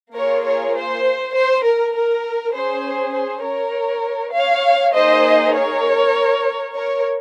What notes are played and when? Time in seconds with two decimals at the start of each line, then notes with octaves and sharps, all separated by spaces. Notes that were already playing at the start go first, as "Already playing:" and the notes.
0.14 A#3 F4 G#4 A#4 C#5
0.44 A#4 C#5
0.75 C5
1.35 C5
1.64 A#4
1.94 A#4
2.54 C#4 G#4 C5
3.14 C5
3.45 A#4 C#5
4.34 C#5 F5
4.95 A#3 D#4 G#4 C5 D#5
5.55 A#4 C#5
6.75 A#4 C#5